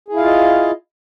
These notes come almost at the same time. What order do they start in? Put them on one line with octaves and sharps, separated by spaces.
G#4 E4 F5 F4 D#5